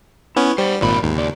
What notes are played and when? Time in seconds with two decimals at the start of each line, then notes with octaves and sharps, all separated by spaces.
0.36 B3 C#4 E4
0.58 G3 C5 F#5
0.81 G#1 A#2 G3 B5
1.03 D#2 G#2
1.15 C#2 D5